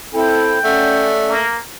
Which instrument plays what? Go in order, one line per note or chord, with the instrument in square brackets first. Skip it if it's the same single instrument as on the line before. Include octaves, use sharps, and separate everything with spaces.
[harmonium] C4 E4 A4 [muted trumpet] G5
[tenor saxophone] A3 [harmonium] C#4 D5 F#5
[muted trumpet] A#3